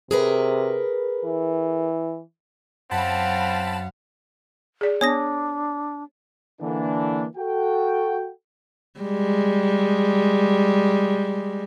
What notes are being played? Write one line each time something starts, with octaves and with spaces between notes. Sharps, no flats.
C3 G#4 A#4 B4
E3
F#2 C4 F5 F#5 A5 B5
G#4 D5
B3 D4 C#5 D#6 A#6
D3 E3 A#3 D4
F#4 A4 G5
G3 G#3